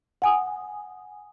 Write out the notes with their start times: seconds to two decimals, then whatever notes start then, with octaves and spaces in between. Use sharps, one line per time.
0.22 F#5 G#5 D#6